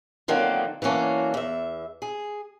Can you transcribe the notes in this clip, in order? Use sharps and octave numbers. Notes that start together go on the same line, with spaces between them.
D3 D#3 F#3 A#3 C4 F4
E3 F#3 A#3 C#4 D4
E2 E5
G#4